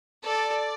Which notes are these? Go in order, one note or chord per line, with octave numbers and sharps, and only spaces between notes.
A4 D5